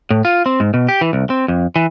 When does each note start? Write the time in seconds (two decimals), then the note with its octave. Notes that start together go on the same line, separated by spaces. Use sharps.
0.10 A2
0.25 F4
0.46 C4
0.60 G#2
0.74 B2
0.89 G4
1.01 E3
1.13 C2
1.30 C4
1.48 F2
1.76 E3